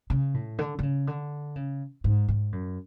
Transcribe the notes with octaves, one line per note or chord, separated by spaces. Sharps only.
C#3
A2
D3
D3
C#3
D3
C#3
G#2
G#2
F#2